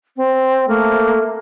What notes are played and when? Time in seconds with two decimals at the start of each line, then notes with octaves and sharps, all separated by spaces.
0.17 C4
0.68 A3 A#3